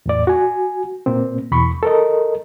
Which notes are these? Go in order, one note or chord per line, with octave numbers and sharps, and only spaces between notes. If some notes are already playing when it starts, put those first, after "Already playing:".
E2 A2 D5
F#4 G#5
A#2 A#3 C4
E2 B2 B5 C#6
A4 A#4 D#5